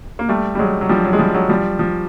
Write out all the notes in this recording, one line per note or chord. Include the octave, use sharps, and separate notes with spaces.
A#3
G3 A3
G3
F#3 G#3
F#3
F3 G3
F#3
G#3
F3 G3
F#3 G#3
F3 G3
F3